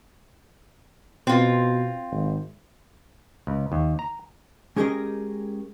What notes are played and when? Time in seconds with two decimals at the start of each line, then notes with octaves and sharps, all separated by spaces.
1.27 B2 C4 F4
2.11 G#1
3.47 C#2
3.72 D#2
3.99 A#5
4.76 G#3 C#4 G4 G#4 A#4 D#5